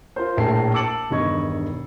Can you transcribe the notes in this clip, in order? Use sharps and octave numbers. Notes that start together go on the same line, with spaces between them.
F4 A#4 C5
A#1 A2 A#4 G5 A5 C7
A5 D6 E6 A6 C#7 F#7
E1 G2 D#3 D#5 C#6 G#6